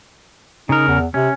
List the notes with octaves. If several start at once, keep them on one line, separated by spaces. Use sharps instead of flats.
C#3 D#4 A#4
E2
C3 C#4